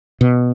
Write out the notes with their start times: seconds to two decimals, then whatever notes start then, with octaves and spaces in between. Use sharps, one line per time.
0.21 B2